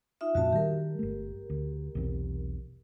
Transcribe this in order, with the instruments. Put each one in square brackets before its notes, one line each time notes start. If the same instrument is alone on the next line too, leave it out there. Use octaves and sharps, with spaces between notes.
[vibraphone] D#4 F4 E5
[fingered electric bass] F2 A#2 C#4 [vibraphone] F#4 E5 A5
[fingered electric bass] D#3 G3 [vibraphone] G4 A#4
[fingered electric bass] G1 A3
D2
B1 E2 C3